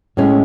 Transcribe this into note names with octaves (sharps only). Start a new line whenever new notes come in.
A2 G#3 C#4